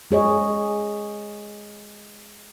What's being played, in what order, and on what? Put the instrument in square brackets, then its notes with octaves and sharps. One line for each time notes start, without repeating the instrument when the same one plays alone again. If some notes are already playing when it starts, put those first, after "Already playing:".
[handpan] G#3 G#4 C#5 D#5